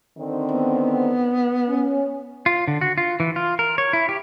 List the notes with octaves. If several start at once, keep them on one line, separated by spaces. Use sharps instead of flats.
D3 D#3 C4
B3
C#4
F4
D3
F#4
F4
E3
F4
A#4
C#5
E4
G4